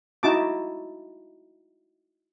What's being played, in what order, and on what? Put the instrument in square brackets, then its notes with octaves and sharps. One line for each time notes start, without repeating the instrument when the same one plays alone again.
[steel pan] D#4 E4 F#4 A5 D6